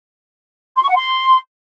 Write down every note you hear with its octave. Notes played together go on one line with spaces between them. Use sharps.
C6
C#6
F#5
C6